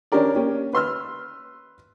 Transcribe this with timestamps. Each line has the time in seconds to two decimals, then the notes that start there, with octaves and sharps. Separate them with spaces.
0.12 C#4 D4 G4 A#4 D5
0.35 A#3 C#4 G4
0.73 B4 C6 E6 F6